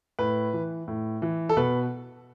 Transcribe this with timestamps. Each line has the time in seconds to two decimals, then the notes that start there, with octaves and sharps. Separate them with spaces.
0.19 A2 B4
0.53 E3
0.88 A2
1.22 E3
1.49 A4
1.57 B2 B4